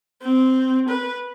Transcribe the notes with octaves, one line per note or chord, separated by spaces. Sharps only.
C4
B4